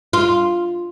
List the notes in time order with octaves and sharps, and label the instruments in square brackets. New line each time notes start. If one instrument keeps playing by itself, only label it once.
[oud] F4